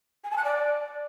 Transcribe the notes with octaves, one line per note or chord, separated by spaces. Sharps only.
G#5
A5
F#6
D5